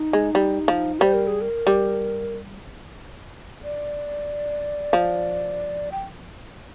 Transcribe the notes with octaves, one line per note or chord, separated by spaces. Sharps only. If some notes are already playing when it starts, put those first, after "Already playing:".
Already playing: D#4
G#3
G3
F3
G3 C5
A#4
G#4
A#4
G3
D5
F3
G5